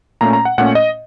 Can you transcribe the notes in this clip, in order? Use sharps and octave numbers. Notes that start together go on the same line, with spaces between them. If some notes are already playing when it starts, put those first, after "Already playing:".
A#2 A3 C#4 A#5
A#5
F#5
A#2 A3 C#4 F#5
D#5